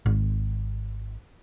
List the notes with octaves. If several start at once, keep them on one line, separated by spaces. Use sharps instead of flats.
G#1